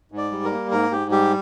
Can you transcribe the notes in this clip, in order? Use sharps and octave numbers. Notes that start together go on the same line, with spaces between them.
G#2
D5
G3
A#4
A#3
G#2 A#4
G#2 G4
G3 G4